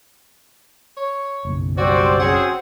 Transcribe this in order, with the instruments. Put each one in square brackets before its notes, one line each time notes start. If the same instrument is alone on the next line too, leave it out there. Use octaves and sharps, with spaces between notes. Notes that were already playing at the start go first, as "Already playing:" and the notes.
[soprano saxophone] C#5
[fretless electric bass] F#1 B1
[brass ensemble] G3 C5 D5 [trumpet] C4 [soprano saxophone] F#4
[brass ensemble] C#4 F#4 G#4 [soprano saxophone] F#5